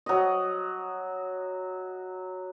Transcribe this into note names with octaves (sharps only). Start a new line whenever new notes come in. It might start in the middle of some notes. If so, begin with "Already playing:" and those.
F#3 D#5